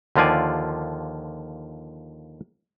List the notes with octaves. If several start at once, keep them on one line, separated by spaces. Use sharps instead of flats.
D#2 D3 F3 F4 D5 G#5